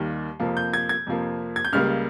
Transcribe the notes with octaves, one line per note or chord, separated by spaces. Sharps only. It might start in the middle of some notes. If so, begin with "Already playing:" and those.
Already playing: D#2 D#3 G3 A#3
F2 C3 F3 A#3
G6
G#6
G#6
F2 C3 F3 A#3
G#6
G6
C#2 C#3 G3 A#3 F6